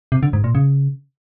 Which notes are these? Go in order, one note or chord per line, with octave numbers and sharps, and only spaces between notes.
C3
D3
G#2
A#2
C#3